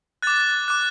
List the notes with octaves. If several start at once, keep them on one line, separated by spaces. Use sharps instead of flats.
D6 F#6 A6
D6 F#6